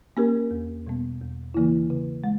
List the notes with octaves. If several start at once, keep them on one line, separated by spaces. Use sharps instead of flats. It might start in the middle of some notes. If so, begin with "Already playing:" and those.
A#3 C#4 G4 A#4
E2
B2 G3 B3
E2
C#3 E3 A#3 E4
C#3
G#3